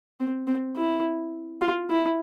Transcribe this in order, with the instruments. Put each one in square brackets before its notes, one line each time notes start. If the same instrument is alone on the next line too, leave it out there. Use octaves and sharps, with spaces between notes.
[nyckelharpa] C4
C4
E4
F4
E4